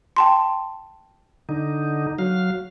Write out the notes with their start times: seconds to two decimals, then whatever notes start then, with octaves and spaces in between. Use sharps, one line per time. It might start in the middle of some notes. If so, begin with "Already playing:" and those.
0.17 G5 A5 C6
1.49 D3 D#4
2.19 F#3 F5